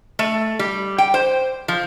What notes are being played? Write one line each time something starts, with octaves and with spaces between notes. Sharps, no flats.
A3
G3
G5
C5
F3